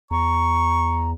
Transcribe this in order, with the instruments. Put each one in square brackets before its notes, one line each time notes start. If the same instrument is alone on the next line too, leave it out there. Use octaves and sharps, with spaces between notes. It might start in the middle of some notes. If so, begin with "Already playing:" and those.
[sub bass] E2 [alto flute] A#5 [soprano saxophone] C#6